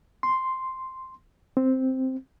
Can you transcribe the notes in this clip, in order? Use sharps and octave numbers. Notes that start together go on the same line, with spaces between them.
C6
C4